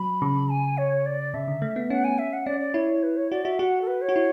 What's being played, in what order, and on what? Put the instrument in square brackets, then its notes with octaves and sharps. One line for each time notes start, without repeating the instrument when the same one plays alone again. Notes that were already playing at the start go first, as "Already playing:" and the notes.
Already playing: [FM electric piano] F#3 [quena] B5
[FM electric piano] C#3
[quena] G#5
C#5
D5
[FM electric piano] C#3 [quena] E5
[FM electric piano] D3
A3
B3
[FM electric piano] C#4 [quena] F#5
[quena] G#5
E5
F#5
[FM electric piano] C#4 [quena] D5
[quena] D5
[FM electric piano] E4 [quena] C#5
[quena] B4
C#5
[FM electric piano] F#4 [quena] D5
[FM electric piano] F#4 [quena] E5
[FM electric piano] F#4 [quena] F#5
[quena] A4
B4
C#5
[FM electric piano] F#4
E4